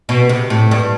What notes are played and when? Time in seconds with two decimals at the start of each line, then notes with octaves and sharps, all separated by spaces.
0.09 B2
0.29 C3
0.50 A2
0.71 G2